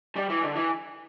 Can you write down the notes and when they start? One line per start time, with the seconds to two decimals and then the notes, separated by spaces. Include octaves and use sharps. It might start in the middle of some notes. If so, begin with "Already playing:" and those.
0.16 G3
0.30 E3
0.42 D3
0.56 E3